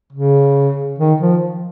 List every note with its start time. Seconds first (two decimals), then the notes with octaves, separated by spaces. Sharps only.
0.13 C#3
0.99 D#3
1.21 F3